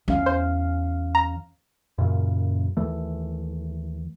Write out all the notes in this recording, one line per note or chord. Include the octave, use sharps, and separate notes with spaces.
E2 C#4 F5
C5
A#5
F#2 A#2 C#3
D#2 E3 A3